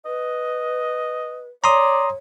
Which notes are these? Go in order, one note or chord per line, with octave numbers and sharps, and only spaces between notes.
B4 D#5
C#5 D5 A#5 C6 D#6